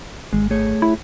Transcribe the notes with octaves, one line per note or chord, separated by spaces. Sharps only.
G#1 G#3
A3 G#4 C#5
E4